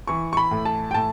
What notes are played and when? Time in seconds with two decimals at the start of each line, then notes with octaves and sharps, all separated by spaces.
0.07 E3 C#6
0.33 C#6
0.37 B5
0.51 A2
0.65 A5
0.91 G5
0.94 A2 A5